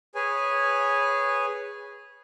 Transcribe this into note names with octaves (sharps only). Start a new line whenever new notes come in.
G#4 B4 C#5 G#5